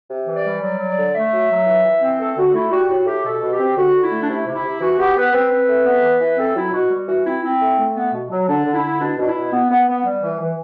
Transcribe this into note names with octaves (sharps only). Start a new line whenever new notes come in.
C3
E3
D5
G3
F#3 D5
F#3
D5
D3
A3 E5
F#3
F#3
E3
E3
C4
A3 A4
D3 F#4
A3 E4
G3 F#4
A2 F#4
A2 G4
B2 A4
B2
G4
C4
D3 F#4
D3
E4
A3
D4
C3 E4
C3
E4
C3
E3 F#4
B3 G4
B3 B4
C4 B4
C4
A3
B3
E3
E3
C4 A4
F#3 E4
B2 F#4
G3
E3 F#4
C4 E4
C4 E4
A3
A3
B3
B2
F#3
D3 D4
D3
E4
D3
B2 D4
B2 D4
E4
B2
B3
B3
B3
G3
E3
E3